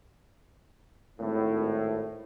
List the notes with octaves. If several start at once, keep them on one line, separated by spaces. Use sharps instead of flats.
G#1 A2